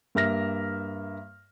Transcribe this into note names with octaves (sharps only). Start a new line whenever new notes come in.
G2 A#3 E5 F6 A#6